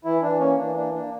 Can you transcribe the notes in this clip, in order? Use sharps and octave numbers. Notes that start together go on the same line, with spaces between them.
E3 E4
E3 D4
A#3 C#4
E3 D4
A#3 D4
A#3 D4